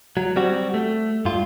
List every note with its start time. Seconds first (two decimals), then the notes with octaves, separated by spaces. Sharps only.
0.17 F#3
0.36 G3 C4 F#4
0.74 A3
1.25 G2 F4